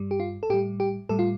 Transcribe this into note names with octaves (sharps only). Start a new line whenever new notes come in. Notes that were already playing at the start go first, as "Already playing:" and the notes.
Already playing: G2 G3
G4
F4
A4
A2 G3 G4
G4
A2 G3 A4
F4